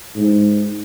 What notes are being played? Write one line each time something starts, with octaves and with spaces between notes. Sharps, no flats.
G#2